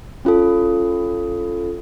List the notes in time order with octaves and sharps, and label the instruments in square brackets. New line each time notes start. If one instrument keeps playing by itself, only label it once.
[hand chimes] C#4 F4 A4